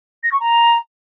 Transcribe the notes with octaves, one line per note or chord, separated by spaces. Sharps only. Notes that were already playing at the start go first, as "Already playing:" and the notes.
A#6
C#6
A#5